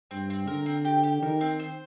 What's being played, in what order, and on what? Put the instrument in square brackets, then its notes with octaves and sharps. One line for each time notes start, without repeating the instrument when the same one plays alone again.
[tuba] G2 [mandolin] C4
[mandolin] C4
[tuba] D3 [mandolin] A#4
[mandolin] C4
G4
G4
[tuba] D#3 [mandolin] A#4
[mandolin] C4
C5